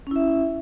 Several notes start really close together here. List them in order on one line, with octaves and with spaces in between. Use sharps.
C#4 E4 E5